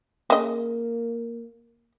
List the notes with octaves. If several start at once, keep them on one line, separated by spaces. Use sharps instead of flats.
C#3 A#3 D#5